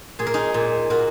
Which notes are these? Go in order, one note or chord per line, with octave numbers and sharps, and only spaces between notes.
A#2 G#4
A#4
D#4 G#4
A#2
A#2 F#4 A#4